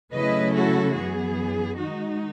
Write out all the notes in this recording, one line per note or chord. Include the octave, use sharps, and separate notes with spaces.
C#3 F#3 A3 C#4 E4 B4 D#5
F#4 A4
F#2 E3 B3 G#4
D#3 G#3 D#4 F#4